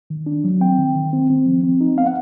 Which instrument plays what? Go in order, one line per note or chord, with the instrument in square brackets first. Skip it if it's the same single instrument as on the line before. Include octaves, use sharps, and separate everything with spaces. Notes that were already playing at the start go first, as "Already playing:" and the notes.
[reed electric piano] D#3
D4
F#3
C4 G5
D#3
D#3
C4
C4
F3
C4
D#4
B3 F5
F#5